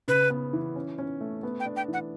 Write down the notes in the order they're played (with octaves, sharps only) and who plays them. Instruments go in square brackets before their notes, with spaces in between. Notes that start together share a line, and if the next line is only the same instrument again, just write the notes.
[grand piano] C#3 [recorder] B4
[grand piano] B3
E3
C#4
C#4
A3
B3
[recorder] G5
[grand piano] D4
[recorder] G5
[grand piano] E3
[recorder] F#5